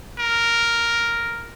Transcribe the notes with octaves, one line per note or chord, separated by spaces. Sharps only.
A#4